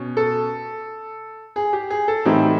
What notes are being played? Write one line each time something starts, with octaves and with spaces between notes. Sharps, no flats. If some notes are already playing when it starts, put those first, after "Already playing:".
Already playing: B2 C#4
A4
G#4
G4
G#4
A4
A2 E3 G3 C4 D#4